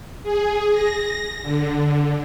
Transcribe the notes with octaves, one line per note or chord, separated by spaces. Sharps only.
G#4
A#6
D3